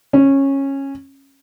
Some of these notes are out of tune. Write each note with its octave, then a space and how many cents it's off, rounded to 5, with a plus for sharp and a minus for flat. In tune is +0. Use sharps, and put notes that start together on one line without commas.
C#4 -15